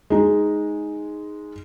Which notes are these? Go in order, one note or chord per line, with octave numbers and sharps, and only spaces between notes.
G#3 D#4